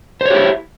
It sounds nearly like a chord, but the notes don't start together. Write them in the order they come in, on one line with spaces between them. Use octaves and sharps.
C5 C#5 G4 E4